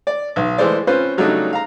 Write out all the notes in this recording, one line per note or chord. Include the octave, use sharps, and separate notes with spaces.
D5
B1
E3 G#3 A3 C5 D5
C4 C#4 F4 B4 C5
C#3 F#3 G3 A3 D4 D#4
F5 A#5